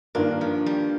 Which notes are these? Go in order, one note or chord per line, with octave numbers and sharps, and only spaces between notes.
G2 D#3 A#3 D4 F4 A#4
F3
G3